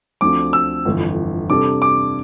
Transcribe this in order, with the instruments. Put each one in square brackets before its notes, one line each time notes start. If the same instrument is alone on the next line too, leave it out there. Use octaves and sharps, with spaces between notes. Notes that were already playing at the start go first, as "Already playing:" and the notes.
[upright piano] D2 D3 F3 C4 [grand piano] D6
[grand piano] E6
[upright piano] G1 F2 E3
[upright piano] C3 G3 D4 A4 [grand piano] D6
[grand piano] D6